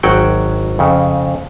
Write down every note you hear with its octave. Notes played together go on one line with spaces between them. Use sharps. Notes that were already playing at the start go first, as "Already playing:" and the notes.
G#1 F#3 F#5 G5
F2 C#3